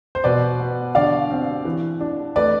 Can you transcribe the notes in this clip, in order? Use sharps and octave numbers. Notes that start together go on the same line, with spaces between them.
C5
B2 B4 D5
B3
D3 D5 F5
C4
E3
D4
A3 B4 D5